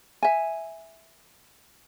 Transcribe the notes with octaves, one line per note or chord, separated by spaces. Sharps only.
E5 G#5